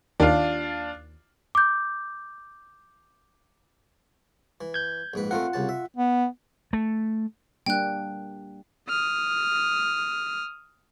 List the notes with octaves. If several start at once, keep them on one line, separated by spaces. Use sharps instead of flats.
D#2 D4 F4
D6 G6
E3
G6 G#6
A#1 G#2 B4
A3 C4 F4 A#4 F#5
C2 C#3 A5
E5
B3
A3
G3 A#3 D4 G5 F#6
D#6 F6